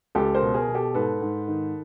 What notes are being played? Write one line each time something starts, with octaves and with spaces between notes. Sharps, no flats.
C#2 G4 A4
A#4 C5
B2
G#4 A#4
B2
G4 A4
G#2 A4 B4
G#2
D#3